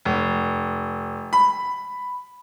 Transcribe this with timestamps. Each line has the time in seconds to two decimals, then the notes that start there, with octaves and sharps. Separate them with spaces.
0.05 F1
1.33 B5